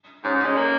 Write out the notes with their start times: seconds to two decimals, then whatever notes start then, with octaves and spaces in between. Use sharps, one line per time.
0.24 G#2 C#4
0.35 G#2
0.41 C#4
0.46 G#3
0.56 A#3